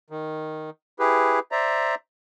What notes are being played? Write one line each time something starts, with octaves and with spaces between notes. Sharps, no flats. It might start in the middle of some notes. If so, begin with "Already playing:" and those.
D#3
E4 G4 G#4 B4
C5 D5 E5 A#5